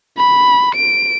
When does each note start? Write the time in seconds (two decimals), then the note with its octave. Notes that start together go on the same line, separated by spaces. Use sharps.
0.18 B5
0.75 D7